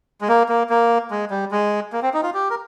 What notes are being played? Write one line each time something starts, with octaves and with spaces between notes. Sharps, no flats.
G#3
A#3
A#3
A#3
G#3
G3
G#3
A#3
C4
D#4
F4
G4
A#4